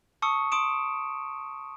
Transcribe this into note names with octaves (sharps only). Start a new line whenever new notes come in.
A5 C#6 D#6 E6 C#7
C6 D#6 D7 E7